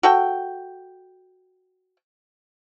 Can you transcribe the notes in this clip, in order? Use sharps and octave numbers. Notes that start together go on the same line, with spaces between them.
F#4 A4 G5